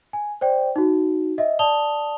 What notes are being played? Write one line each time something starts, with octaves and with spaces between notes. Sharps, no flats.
G#5
C5 D5 G5
D#4 F#4
D#5 E5
D5 A5 D#6 F7 G7